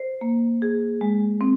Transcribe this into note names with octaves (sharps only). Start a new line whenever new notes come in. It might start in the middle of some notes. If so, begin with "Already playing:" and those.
Already playing: C5
A#3
G#4
G#3
C4